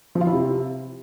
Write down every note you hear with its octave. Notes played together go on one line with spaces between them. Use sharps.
F3
F4
E4
C3